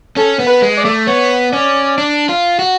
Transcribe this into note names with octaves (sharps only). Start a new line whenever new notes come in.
C#4 A4
B3
B4
G#3
D5
A3
B3 C#5
C#4 D5
D4
F4
F#4